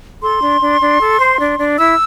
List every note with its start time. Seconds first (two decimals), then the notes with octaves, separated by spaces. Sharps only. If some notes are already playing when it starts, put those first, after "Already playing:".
0.22 A4 C6
0.42 D4
0.61 D4
0.80 D4
1.00 A4
1.19 C5
1.39 D4
1.58 D4
1.78 E4 E6